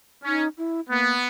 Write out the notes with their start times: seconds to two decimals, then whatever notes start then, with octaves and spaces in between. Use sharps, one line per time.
0.24 C#4 D#4
0.58 E4
0.89 A#3 B3